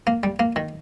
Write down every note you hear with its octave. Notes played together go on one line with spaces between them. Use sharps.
A#3
G3
A#3
D#3